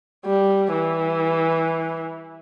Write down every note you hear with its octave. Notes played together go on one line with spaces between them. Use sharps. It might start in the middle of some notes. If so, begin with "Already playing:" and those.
G3
E3